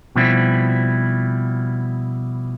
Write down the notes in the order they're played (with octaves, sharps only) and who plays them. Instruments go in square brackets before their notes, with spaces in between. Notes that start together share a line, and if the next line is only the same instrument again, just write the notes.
[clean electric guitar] B2 F3 G3 C4 E4